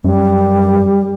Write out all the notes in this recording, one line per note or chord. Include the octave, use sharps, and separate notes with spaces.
F#2 G3